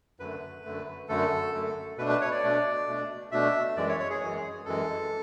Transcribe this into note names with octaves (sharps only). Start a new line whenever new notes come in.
F#2 D3 A3 B4
F#2 D3 A3
F#2 D3 A3 A4
F#2 D3 A3
B2 A3 D4 B4
B4
C#5
D5
B2 A3 D4
B2 A3 D4
B2 A3 D4 E5
F#2 E3 G#3 D5
C#5
C#5
G#4
F#2 E3 G#3
F#2 E3 G#3 A4